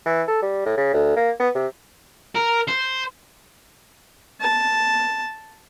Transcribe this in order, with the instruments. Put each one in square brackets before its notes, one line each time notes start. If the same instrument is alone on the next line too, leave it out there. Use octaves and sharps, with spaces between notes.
[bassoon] E3
A4
G3
A2
C#3
D2
A#3
B3
C3
[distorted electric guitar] A#4
C5
[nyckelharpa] A5